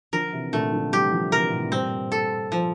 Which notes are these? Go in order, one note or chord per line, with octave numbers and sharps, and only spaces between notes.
D3 F3 A#4
C3 E3
A#2 D3 A3
D3 F3
E3 G3 G4
D3 F3
C3 E3 A#4
A2 C3
G2 A#2 C4
A4
F3